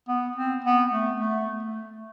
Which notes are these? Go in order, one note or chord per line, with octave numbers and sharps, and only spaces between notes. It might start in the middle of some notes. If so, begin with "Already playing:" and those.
B3
C4
B3
A3
A3
A3